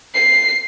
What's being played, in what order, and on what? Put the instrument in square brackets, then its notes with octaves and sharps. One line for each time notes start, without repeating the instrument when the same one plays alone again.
[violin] C7